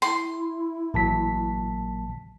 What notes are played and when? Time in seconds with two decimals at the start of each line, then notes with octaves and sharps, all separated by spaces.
0.02 E4 C6
0.94 A1 A#2 F#3 A5 B6